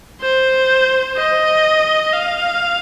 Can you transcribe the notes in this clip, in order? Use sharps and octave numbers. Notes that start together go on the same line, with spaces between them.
C5
D#5
F5